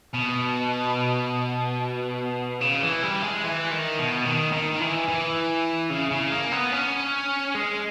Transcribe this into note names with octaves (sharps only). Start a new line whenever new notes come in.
B2
C#3
E3
G3
G#3
E3
D#3
B2
D#3
D#3
D#3
E3
E3
C#3
C#3
A#3
B3
C#4
G#3